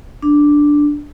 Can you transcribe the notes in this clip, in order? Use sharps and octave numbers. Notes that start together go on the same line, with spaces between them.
D4